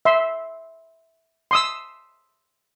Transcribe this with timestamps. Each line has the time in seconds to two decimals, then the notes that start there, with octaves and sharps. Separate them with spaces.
0.05 E5 C6
1.51 C6 D#6 E6